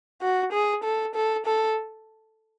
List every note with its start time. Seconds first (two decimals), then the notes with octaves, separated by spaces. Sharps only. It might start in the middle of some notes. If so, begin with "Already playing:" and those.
0.22 F#4
0.52 G#4
0.84 A4
1.15 A4
1.46 A4